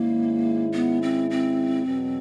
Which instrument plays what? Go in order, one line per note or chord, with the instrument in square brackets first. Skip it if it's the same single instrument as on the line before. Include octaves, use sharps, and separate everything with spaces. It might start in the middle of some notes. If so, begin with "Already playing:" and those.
Already playing: [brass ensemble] G#2 D#3 G#3 C#4 E4 [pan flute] A#3
[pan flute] B3
C4
C4
[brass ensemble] E2 B2 F#3